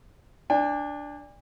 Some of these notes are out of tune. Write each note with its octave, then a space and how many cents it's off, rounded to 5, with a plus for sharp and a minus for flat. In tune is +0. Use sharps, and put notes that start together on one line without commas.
D4 +0 G#5 -45